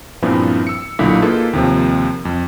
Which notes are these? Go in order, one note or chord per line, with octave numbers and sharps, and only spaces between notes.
G2 A#2 F3 B3 C4 E4
E6 C#7
B1 A#2 D3 E4 B6
A#3 D#4 F4 G#4 A4 B4
D#2 C3 F3
F2